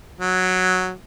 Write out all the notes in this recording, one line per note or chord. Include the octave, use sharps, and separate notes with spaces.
F#3